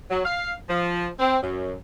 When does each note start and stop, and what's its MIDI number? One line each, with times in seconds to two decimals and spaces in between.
0.10 0.22 54
0.25 0.52 77
0.69 1.07 53
1.19 1.37 60
1.41 1.74 42